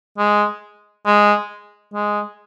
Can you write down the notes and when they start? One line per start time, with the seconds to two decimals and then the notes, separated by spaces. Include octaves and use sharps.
0.18 G#3
1.06 G#3
1.93 G#3